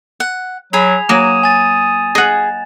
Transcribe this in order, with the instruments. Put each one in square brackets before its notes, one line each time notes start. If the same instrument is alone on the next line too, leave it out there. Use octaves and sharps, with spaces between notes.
[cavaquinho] F#5
[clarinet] F#3 [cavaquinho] G#4 B5 [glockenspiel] G#6 F7
[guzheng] F#3 A#3 [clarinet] D#6 [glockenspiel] E7
[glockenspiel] G#5 A6
[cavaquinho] G#4 [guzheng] D#5 F#5